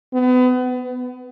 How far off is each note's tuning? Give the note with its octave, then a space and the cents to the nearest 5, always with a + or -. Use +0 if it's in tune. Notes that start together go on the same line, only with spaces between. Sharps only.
B3 +30
B3 +10